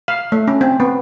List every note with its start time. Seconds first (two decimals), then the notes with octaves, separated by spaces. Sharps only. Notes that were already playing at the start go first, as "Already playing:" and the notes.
0.08 F5
0.32 A3
0.48 C#4
0.61 C4
0.80 B3